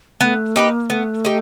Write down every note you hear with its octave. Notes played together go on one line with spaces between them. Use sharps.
A3 B3
A#3 D#4 G4 B4
A3 B3
D#4 G4